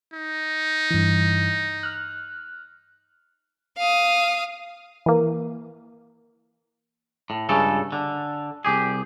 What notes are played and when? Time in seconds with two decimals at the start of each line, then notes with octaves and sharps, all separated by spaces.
0.14 D#4
0.91 G2 E3
1.83 F6 F#6
3.77 F5 D#6
5.06 E3 A#3
7.30 A2
7.49 C#2 G2 C#3 A4
7.92 D3
8.65 C2 G4 G#4